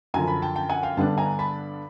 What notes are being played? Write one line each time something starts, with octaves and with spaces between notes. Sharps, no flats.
F#2 D3 F3 G#5 A#5
A5 B5
G5 A5
G5 A5
F#5 G#5
F5 G5
G2 D3 G3 B3 D4 G5 A5
G#5 A#5
A5 B5